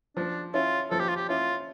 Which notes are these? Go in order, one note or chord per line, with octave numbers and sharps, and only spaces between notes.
F3 D4
C#4 E4 F4
F3 A4
G4
F4
G4
C#4 E4 F4